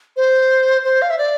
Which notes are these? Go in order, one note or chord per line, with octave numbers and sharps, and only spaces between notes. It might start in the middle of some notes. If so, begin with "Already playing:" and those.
C5
C5
F5
E5
D5